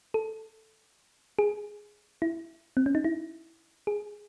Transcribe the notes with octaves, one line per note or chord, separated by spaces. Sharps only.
A4
G#4
E4
C4
C#4
D#4
E4
G#4